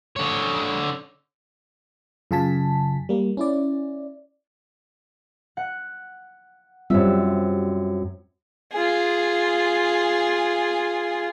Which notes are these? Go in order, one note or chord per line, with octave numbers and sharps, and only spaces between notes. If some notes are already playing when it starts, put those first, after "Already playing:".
D3 C#5
F#2 C#3 F4 G#5 A5 B6
G3 A#3
C#4 E4 D5
F#5
F#2 G3 C4 F4 E5
F4 G#4